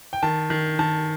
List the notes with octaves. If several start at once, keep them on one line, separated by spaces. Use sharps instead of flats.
G5
D#3 A5
D#3
D#3 A5